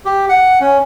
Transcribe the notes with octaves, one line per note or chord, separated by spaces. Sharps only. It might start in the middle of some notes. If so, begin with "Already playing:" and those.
G4
F#5
C#4